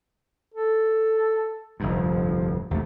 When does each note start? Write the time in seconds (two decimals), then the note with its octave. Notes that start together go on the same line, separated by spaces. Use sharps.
0.54 A4
1.80 F1 D2 G2 F3
2.71 D#2 C3 A3